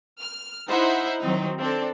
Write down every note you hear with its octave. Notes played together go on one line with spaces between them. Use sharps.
F6
D#4 E4 C5 E5 F#5
D#3 F#3 C4 D#4
C4 D4 A4